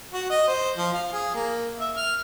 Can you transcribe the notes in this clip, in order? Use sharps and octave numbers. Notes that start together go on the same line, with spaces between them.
F#4
D#5
C5
F3
F5
G#4
A#3
E5
F6